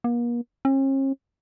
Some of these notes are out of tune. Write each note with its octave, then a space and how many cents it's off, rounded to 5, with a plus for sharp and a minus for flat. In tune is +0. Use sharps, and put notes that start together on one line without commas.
A#3 +40
C#4 -45